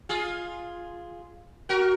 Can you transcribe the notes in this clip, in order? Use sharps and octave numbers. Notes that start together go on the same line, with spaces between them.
F4 G#4
F#4 A#4